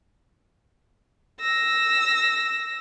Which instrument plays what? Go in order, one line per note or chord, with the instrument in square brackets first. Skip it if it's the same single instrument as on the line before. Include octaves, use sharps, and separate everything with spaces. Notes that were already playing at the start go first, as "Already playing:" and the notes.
[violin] E6 A#6